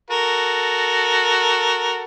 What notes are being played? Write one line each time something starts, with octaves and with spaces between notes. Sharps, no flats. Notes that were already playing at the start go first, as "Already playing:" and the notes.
F#4 A4 A#4